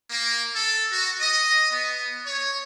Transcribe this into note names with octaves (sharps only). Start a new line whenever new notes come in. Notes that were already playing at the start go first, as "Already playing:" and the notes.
A#3
A4
F#4
D#5
B3
C#5